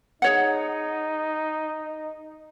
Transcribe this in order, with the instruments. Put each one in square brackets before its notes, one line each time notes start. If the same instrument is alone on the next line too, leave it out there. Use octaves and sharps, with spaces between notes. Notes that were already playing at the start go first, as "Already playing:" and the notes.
[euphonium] D#4 [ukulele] G#4 C#5 F#5